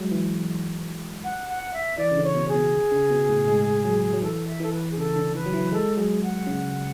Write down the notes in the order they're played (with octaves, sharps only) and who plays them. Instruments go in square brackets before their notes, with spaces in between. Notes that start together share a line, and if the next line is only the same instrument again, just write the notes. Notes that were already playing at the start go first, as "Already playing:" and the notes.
Already playing: [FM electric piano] F#3 G#3
E3
[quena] F#5
F#5
E5
[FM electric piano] E3 [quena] D5
[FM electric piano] C#3
D3
[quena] C#5
[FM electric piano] B2
[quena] G#4
[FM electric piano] B2
C#3
B2
A2
G#3
F#3
F#3
[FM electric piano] E3 [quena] A4
[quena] E5
[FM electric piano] E3 [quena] A4
[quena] B4
G#4
[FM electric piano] C#3 [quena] A4
[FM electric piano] D3
[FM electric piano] E3 [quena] B4
[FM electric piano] F#3
E3
[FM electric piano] G#3 [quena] A4
[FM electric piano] F#3 [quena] G#4
[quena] F#5
[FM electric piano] C#3